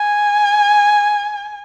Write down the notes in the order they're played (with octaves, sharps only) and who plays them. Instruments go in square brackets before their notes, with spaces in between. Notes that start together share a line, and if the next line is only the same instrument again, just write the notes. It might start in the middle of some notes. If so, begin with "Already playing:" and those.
Already playing: [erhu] G#5